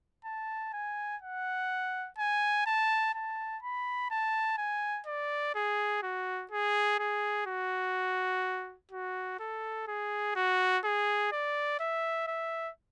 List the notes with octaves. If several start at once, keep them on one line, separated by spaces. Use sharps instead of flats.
A5
G#5
F#5
G#5
A5
A5
B5
A5
G#5
D5
G#4
F#4
G#4
G#4
F#4
F#4
A4
G#4
F#4
G#4
D5
E5
E5